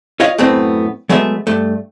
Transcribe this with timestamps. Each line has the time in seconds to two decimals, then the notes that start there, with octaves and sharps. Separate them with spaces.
0.20 F4 C#5 D#5 F5
0.38 F#2 A2 A3 B3 C4
1.09 F#3 G#3 A3 B3 E5
1.47 G2 A3